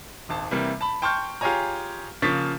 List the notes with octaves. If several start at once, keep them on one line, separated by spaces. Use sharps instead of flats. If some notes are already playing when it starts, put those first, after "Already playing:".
D#1 G#1 A5
C3 E3 G3 A#3
A5 B5
G5 A5 C6 C#6 F6 G6
F4 G4 G#4 C#5 G#5 A#5
C#3 F3 A#3 C#6 A6 B6